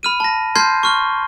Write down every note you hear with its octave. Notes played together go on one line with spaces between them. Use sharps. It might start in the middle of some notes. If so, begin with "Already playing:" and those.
B5 F6 D#7
A5 A#6
A5 C6 F6 G6 G#6 C7
C#6 F6 G7